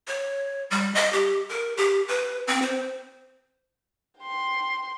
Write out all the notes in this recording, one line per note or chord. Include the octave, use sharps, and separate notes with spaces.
C#5
G3
D#5
G4
A#4
G4
B4
C4
C5
G5 C6